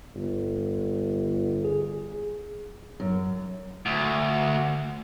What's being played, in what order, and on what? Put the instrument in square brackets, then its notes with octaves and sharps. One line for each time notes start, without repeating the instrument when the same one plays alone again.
[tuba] G1
[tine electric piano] G#4
[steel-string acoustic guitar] F#2
[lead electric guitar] D2